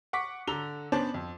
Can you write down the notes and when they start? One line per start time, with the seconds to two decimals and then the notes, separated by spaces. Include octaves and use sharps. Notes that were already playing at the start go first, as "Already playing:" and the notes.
0.13 F#5 C#6 D6 B6
0.48 D3 A4 A#5 F7 G7
0.92 B3 C#4 D4 C5 D5 A5
1.14 F2